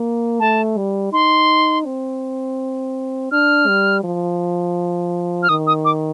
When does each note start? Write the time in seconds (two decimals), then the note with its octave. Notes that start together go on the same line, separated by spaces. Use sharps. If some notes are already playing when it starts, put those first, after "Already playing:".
Already playing: A#3
0.40 A3 A5
0.77 G3
1.12 D#4 C6
1.85 C4
3.32 D4 F6
3.67 G3
4.03 F3
5.43 F6
5.49 D#3 D#6
5.67 D#6
5.85 D6